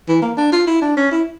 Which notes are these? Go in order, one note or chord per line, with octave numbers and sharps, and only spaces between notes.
E3
A#3
D4
F4
E4
D4
C#4
E4